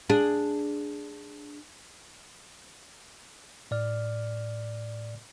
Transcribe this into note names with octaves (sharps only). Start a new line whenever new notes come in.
D4 G#4
A2 D5 F6